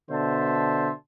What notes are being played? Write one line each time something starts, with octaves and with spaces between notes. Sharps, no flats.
B2 D3 C5 E5 A5 C6